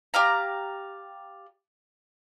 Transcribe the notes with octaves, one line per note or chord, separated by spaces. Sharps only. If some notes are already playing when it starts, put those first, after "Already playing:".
G4 D5 F5 A#5